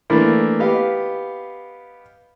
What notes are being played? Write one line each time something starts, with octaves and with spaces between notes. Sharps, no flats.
E3 A3 A#3 D4 E4
B3 G4 B4 D#5 F5